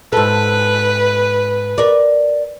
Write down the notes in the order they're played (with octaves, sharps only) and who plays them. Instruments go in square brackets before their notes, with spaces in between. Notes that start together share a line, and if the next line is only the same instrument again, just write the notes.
[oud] G#2 A4 [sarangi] B4
[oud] A#4 D5